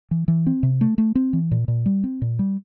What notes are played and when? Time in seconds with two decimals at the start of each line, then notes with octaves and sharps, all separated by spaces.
0.11 E3
0.28 E3
0.47 C4
0.63 C3
0.81 A3
0.98 A3
1.15 C4
1.33 E3
1.51 A#2
1.68 A#2
1.86 G3
2.04 C4
2.22 A#2
2.39 G3